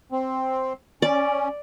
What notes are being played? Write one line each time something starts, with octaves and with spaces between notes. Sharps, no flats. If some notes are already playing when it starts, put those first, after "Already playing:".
C4
C#4 D5